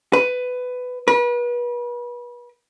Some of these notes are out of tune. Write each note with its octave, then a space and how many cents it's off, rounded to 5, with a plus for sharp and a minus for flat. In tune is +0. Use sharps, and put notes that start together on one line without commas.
B4 +15
B4 -35